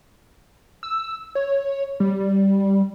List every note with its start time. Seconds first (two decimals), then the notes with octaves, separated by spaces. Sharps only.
0.83 E6
1.35 C#5
2.00 G3